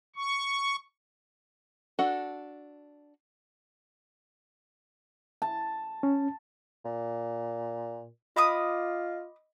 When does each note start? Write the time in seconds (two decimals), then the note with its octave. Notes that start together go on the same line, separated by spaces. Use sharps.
0.16 C#6
1.99 D4 F#4 A4 F#5
5.42 A5
6.03 C#4
6.85 A#2
8.36 F4 D#5 B5 D6 D#6